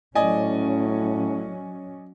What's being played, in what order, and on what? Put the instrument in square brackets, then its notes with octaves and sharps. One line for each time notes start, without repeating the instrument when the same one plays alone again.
[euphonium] A2 [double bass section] F#3 C#4 [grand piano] D5 D#5 G#5